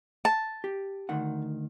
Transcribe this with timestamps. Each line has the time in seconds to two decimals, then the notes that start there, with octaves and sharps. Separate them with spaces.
0.25 A5
0.64 G4
1.09 D2 D#3 F#5